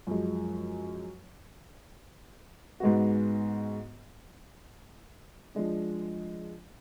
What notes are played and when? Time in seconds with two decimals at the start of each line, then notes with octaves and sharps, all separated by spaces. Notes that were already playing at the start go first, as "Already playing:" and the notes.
0.07 F#2 F3 G#3
2.80 G#2 G#3 B3 F#4
5.55 F3 G#3 D4